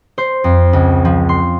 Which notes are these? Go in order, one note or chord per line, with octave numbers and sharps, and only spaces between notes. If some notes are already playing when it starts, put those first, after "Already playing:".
C5
F2
C#2
F3
C6